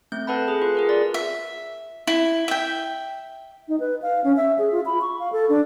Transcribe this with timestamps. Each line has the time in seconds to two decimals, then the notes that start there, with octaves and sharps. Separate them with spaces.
0.12 A3 C4 G6
0.27 A4 B4 F#5 A5 B5
0.48 G#4
0.62 F4 B4
0.75 G#4 A#4 B4
0.89 F4 D5
1.14 E5
2.07 E4
2.48 E5 G5
3.69 D#4
3.80 B4
4.02 F5
4.24 C#4
4.36 E5
4.59 G#4
4.72 F4
4.86 B5
5.01 C#6
5.20 F5
5.32 A4
5.49 D4